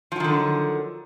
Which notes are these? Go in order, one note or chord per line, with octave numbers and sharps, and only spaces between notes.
D3 D#3 F3 F#3